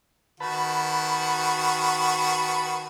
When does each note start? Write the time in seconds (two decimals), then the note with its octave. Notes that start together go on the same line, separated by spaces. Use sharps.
0.40 D#3 F#4 B4 A5 B5